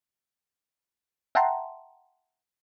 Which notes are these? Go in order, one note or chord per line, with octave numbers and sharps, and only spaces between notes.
E5 F#5 G5 A5 A#5 C6